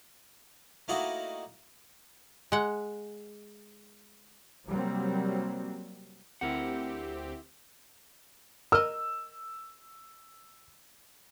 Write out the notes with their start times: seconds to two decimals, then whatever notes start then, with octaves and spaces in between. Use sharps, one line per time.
0.88 A3 A#3 D#4 E4 F#4
2.52 G#3 F#5
4.67 C3 F#3 G3 A#3 C4
6.41 D2 C4 E4 G4 A#4 F#5
8.72 A#4 D#5 E6